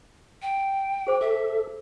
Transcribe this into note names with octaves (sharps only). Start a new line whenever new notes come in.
G5
G#4 C5 D6
A4 E5